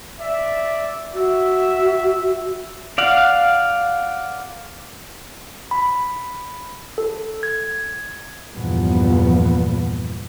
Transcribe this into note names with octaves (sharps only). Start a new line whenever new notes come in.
D5 E5
F#4 E5
D5 F5 F#5
B5
A4
G#6
E2 G2 A#2 F3 B3